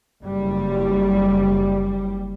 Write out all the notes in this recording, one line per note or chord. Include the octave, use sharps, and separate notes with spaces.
F#1 G3